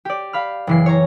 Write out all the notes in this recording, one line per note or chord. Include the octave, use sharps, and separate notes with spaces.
G4 D5
F5 B5 F6
F#1 E3 C7
C#5 A#5